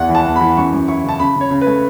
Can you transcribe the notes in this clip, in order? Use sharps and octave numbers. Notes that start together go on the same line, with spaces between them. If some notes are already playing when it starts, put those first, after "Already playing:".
Already playing: E2 E4 F#5
E3
A5
E2
E3 B5
F#2 C#6
F#2
E4 C#6
C#3 A5
C#3 B5
C#3 C#5
C#3
B4
A3